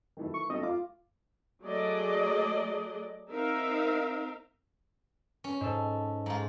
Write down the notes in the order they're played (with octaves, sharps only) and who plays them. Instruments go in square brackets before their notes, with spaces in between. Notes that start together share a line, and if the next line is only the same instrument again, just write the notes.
[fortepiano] D#3 E3 A3
[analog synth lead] C#6
[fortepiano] A3 C4 [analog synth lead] D#5
[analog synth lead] F4 [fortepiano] D6
[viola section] F#3 A3 G#4 D5 D#5
C4 D#4 A#4 E5 F5
[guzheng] C#4
[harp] G#2 A4
[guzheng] G#2 F4